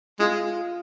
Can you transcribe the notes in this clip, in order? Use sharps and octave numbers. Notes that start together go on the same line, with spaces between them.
G#3 F4